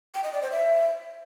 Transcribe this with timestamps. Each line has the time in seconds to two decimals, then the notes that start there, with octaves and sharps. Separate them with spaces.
0.14 G5
0.24 D#5
0.33 D5
0.42 C5
0.51 E5